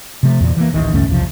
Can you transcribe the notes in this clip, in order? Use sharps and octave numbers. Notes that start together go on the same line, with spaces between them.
C3 F3 A3
E2 A#2
E3 A#3
D1 A1 D#3 E3
C#2 G2 A3 C#4
B1 E2 C3 F3